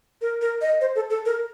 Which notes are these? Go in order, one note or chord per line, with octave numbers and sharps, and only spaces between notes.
A#4
A#4
D#5
C5
A4
A4
A#4